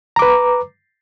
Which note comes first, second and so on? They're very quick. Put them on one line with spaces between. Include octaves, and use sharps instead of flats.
A#5 D6 B4